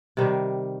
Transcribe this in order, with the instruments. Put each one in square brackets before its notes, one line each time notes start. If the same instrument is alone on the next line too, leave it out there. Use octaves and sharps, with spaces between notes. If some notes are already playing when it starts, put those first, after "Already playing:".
[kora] C3 D#3 G3